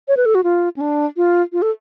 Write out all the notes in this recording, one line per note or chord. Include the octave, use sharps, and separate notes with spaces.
C#5
B4
A4
F#4
F4
C#4
D4
F4
F4
A4